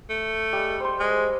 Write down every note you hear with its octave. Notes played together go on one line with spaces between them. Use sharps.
A3
G3 G#3
C5 C6
G#3